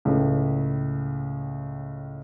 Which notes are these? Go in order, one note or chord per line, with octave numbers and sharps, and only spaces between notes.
C#2 A2